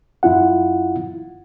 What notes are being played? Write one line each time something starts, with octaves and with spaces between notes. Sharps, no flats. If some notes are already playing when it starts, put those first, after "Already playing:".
F#2 E4 F4 F#5